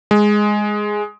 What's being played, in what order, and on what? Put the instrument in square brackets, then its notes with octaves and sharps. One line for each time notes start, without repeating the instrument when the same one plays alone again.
[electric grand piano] G#3